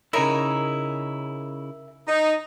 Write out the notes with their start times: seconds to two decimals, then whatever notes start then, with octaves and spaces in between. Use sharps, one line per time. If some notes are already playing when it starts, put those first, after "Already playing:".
0.13 C#3 D#4 E4 A#4 C#5 E5
2.08 D#4